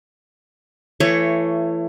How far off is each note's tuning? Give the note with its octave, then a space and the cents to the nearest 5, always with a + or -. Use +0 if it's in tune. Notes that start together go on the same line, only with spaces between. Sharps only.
E3 +30 A3 +20 C#5 +0